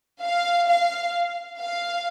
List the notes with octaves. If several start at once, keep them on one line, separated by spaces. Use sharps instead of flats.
F5
F5
F5